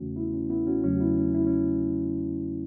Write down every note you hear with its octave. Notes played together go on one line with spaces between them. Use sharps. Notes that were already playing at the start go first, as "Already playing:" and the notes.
Already playing: E2 C#3 E3 A3 C#4 F#4
B3 E4
C#4
B3 E4
C#4 F#4
E2 C#3 F#3 A3 C#4
F#4
B3 E4
C#4
E4
C#4